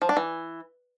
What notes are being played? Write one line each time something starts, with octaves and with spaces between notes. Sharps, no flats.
F3
D4
E3